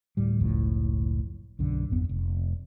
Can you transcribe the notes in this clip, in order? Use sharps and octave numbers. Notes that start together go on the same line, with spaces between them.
D2 A2 G3
F#1 C#2 A2 F3
B1 F#2 D3
G#1 F2 B3
F1